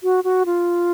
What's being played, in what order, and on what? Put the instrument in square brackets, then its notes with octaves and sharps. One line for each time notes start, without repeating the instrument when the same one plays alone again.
[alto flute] F#4
F#4
F4